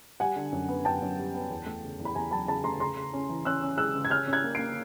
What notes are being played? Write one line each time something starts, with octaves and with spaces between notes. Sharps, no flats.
G3 F#5 G#5
D3
F#2
B3
F#2 G5 A5
F#2
G3
B3
E2
A3
C#3
E2
B5
E2 G#5 A#5
F#3 A5 B5
C#3 A5 B5
A3 A#5 C6
C#3 A#5 C6
C#3
C#4
E3
C#4 E6 F#6
C#4
G#3 E6 F#6
C#3
G#6
C#4 F6 G6
C#4
F#6 G#6
A#3
A#3 C7 D7